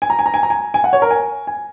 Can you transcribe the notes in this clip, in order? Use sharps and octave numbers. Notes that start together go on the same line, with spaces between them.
G#5
A#5
G#5
A#5
G#5
A#5
G#5
G#5
F#5
C#5
A#4
G#5
G#5